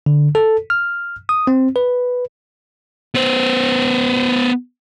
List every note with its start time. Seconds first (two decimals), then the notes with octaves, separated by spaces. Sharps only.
0.06 D3
0.35 A4
0.70 F6
1.29 D#6
1.47 C4
1.76 B4
3.15 B3 C5